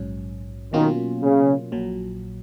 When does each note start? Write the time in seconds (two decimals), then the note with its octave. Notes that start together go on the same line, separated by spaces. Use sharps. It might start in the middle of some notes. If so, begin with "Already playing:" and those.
Already playing: A#1 G#2 F#3 C#4
0.73 B2 D#3 F#3 A#3 C#4 F4
1.23 C#3
1.72 A#1 A#2 F#3